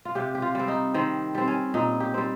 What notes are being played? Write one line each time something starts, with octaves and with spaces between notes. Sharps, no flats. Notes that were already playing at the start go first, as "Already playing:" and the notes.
F4
C3 G4
G4
F4
G3 C4
D#4
D#3 C4
G3 C4
C#4
A#2 D#4
G4
G3 C4